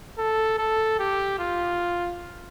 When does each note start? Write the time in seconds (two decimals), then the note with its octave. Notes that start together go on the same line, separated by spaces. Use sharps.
0.18 A4
0.58 A4
0.99 G4
1.39 F4